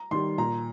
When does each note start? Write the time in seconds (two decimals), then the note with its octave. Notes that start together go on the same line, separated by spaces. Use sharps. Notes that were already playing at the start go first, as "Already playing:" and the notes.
Already playing: A#5
0.11 D#3 G3 C6
0.38 A#2 A#5